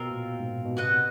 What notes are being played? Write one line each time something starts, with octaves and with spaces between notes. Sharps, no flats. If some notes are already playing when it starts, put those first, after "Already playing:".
Already playing: B2 C4 F4 A#4
A#2
G#2
B2
C3 F#4 B4 D#5 F#5